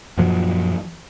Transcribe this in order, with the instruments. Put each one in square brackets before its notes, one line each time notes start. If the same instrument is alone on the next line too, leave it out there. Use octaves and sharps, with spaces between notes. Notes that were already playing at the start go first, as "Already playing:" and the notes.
[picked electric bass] F#2 A#2 F3 F#3